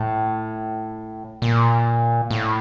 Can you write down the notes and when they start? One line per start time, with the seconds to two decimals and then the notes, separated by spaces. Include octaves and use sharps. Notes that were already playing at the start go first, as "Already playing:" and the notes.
Already playing: A2
1.42 A#2
2.31 A2